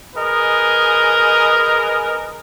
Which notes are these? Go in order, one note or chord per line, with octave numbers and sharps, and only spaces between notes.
G#4 A#4 B4 D#5